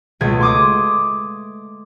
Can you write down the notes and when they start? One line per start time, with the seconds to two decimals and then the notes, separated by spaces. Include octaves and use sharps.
0.21 C#2 B2 A3 G#6
0.41 C6 D6 D#6